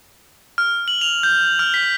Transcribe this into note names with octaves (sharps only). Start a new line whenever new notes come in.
F6
F#7
F7
G6
F6
B6